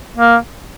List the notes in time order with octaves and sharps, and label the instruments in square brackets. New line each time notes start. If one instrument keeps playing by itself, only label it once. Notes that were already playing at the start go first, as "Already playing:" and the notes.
[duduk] A#3